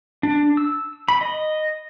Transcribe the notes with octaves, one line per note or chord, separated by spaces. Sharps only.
D4
E6
B5
D#5